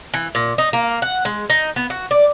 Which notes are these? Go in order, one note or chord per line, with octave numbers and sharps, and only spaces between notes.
E3
A#2
D#4
A#3
F#5
G#3
D#4
B3
F#4
D5